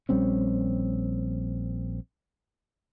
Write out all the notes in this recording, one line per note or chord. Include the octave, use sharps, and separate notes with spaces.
A#1 G3 C4 C#4